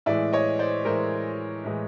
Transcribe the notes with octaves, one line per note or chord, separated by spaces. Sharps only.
A2 E3 G#3 D5 E5
C#5 D#5
C5 D5
A2 E3 G#3 A#4 C5
A2 E3 G#3